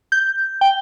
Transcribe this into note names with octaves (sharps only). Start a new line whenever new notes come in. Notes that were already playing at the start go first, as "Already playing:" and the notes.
G6
G5